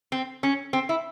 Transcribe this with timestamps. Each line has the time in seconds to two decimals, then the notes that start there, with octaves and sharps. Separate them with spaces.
0.12 C4
0.43 C#4
0.73 C4
0.89 E4